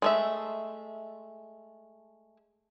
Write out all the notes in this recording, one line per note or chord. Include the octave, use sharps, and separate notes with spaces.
G#3 A3 E5